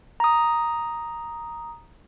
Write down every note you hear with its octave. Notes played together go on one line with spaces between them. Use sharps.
A#5 D#6